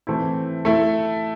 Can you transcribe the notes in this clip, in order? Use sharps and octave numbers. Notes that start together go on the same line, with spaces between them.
E3 A3 C4 E4
A3 E4 A4